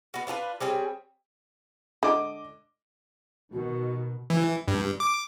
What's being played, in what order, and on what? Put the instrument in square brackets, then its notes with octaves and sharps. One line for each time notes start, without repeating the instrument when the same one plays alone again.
[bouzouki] B3 F#4
D4 F4 G#4 B4
G3 C4 G#4 C#5
[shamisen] D3 [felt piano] D#5 D6
[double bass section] B2 D#3 [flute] F#4
[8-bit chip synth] E3
G2
D6